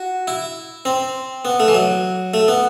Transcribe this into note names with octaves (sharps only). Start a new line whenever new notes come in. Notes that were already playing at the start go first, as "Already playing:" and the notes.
Already playing: F#4
E4
C4
B3
A3
E3
F#3
A3
B3